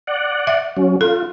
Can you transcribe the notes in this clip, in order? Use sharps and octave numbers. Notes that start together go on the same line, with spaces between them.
D5 F#5
E5
F#3 C#4
F4 A4